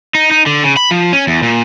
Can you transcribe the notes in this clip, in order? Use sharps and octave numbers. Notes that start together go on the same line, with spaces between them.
D#4
D#4
D3
C#3
B5
F3
C#4
E2
A#2